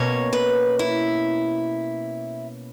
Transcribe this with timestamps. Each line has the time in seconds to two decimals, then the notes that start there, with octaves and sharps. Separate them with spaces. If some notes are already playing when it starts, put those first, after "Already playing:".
Already playing: B2 A#3 C#4 C#5
0.33 B4
0.79 E4